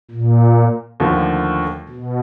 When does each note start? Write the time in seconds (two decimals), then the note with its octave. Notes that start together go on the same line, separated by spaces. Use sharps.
0.11 A#2
1.00 D#2 D3 F3 A3
1.89 B2